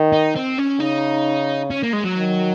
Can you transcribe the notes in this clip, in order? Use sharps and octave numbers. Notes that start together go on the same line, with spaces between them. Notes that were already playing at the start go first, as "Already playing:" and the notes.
Already playing: D#3
D#4
C4
C#4
C#3 D#4
C#4
A#3
G#3
F#3
D#3